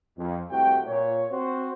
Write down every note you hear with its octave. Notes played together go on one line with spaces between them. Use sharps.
F2
C2 C3 A3 F#4 G5
A#2 C#5
C4 F#4 C5